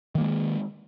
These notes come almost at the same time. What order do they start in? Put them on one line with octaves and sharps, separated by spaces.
D#3 A#3 G#3